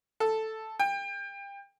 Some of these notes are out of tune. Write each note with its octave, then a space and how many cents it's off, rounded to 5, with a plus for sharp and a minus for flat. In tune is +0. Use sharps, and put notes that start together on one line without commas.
A4 +0
G5 +30